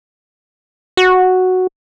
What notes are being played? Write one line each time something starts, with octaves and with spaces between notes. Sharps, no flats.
F#4